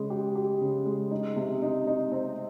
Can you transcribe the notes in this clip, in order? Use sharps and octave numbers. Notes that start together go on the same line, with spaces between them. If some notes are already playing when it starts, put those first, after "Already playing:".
Already playing: C#3 G#3
G4
G4
C#3
G#3
D#4
C3
D#4
D#4
C4